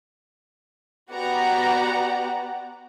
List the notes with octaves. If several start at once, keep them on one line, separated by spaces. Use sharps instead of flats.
B3 F#4 G4 D5 F#5 A#5